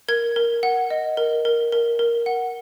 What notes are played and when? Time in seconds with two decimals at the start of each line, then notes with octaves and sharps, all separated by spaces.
0.08 A#4 G#6
0.36 A#4
0.63 F#5
0.90 D#5
1.17 A#4
1.45 A#4
1.72 A#4
1.99 A#4
2.26 F#5